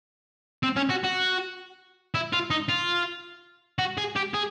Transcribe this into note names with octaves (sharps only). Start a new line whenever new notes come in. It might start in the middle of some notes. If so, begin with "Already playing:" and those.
C4
C#4
F#4
F#4
E4
F4
D#4
F4
F#4
G#4
G4
G#4